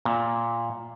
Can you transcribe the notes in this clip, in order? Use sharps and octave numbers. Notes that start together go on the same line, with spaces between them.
A#2